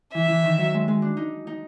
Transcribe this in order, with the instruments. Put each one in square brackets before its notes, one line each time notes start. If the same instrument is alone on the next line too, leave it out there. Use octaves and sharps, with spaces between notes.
[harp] E3 [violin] E5
[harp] E3
D#3
F#3
G#3
G#3
D4
D#4
D#4